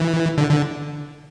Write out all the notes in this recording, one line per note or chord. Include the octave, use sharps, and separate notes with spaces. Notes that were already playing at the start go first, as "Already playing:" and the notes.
Already playing: E3
D3
D3